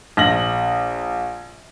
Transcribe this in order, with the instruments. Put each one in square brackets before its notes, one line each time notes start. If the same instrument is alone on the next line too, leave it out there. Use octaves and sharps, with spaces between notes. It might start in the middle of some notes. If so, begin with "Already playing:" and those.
[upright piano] A#1 A#6 F#7